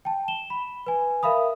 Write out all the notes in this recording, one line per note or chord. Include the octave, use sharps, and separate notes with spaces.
G5 A5
E7 G7
B5
B4 G#5
A#4 E5 F5 B5 D#6